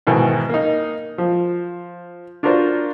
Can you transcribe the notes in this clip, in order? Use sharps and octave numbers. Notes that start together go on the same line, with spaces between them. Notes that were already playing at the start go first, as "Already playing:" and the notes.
G#2 B2 D#3 E3
A#3 D#4
F3
D4 F4 F#4 A#4 C5 D5